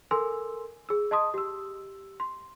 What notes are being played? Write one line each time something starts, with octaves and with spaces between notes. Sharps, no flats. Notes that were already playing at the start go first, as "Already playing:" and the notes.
A4 A#4 G#5 C6 E6
G#4 E6
D#5 A5 C6 D#6
G4 E6
C6